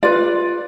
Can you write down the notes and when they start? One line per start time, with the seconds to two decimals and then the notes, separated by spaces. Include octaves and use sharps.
0.03 F4 B4 D5